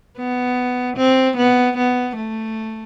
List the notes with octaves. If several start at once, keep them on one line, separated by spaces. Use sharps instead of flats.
B3
C4
B3
B3
A3